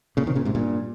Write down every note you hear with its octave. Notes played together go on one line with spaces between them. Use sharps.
A#2 C#3
C3 D#3
A#2 C#3
G#2 C3
G2 A#2